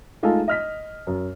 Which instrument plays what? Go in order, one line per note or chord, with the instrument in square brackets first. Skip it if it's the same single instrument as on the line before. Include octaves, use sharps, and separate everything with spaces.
[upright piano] G#3 A3 D#4 F4 G#4 A4
D#5 F6 B6
F#2